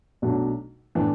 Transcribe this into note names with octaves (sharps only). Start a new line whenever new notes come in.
B1 B2 F#3 A3 D4
A2 E3 B3 D4